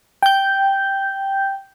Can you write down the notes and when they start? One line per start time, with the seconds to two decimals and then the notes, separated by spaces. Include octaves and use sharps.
0.23 G5 G6